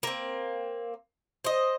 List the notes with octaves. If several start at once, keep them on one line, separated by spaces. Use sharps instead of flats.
A#3 C4
C5 D#5